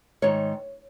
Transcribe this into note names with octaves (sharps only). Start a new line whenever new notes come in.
G#2 D#3 C#5